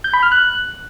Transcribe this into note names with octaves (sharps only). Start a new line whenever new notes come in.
G6
B5
F6
F#6